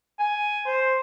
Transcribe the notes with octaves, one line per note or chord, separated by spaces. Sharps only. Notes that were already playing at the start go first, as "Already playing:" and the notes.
G#5
C5